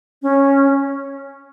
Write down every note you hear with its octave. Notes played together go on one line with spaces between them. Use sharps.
C#4